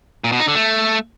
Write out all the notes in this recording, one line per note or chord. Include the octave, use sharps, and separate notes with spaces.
A#2
B2
D#4
D3
A3